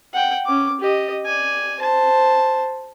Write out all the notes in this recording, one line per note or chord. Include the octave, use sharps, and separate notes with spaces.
F#5 G5
C#4 D6
G4 D#5
D5 G#5
C5 A5